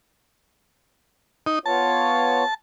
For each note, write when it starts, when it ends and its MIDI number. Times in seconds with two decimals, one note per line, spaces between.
1.46 1.59 63
1.66 2.44 59
1.66 2.44 65
1.66 2.44 73
1.66 2.54 81